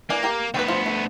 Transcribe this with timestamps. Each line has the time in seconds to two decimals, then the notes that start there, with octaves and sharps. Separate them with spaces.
0.10 E3 A#3 D4 G#5
0.23 G4 A#4 G5
0.54 D2 B3 B4 C#5 G5
0.68 F3 F4
0.86 A3